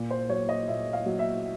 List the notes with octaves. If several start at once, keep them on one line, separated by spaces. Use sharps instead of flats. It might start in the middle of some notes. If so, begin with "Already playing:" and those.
Already playing: A#2
C5
F#3 C#5
D#5
A#2 E5
F5
F#3
E5